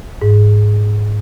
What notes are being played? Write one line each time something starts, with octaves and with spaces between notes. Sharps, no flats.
G#2